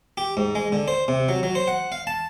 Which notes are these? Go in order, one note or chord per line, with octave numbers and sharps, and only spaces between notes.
G4
G#2
G#3
D3
C5
C3
F#3
F#3
C5
F#5
F5
A5